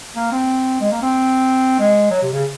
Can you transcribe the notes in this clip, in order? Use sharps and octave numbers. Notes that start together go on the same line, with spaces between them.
A#3
C4
G#3
A#3
C4
G#3
F#3
C3
C#3